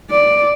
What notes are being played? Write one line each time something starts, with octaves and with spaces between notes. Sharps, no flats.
D5